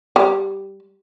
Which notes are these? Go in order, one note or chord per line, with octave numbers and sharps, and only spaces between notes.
G3